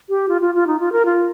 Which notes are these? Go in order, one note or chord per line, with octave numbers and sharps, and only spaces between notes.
G4
F4
F4
F4
D#4
F4
A#4
F4